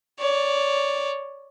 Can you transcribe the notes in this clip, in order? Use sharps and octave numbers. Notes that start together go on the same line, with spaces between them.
C#5 D5